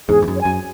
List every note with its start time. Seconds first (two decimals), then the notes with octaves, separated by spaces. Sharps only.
0.09 E2 G#2 G#4
0.22 E2
0.28 F#2
0.36 C#5
0.41 F#2 G#5